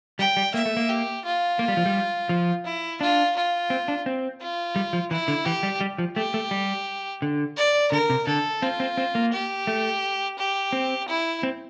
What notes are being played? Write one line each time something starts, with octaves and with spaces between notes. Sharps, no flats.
G3 G5
G3
A#3 E5
A3
A#3
G4
F4
A#3
G3
F3
G3
F3
E4
D4 F4
F4
C4
D4
C4
F4
G3
F3
E3 E4
D3
E3 G4
G3
G3
F3
A3 G4
A3
G3
D3
D5
D3 A#4
C3
D3 A4
C4 F4
C4
C4
A#3
G4
A3
G4
C4
E4
C4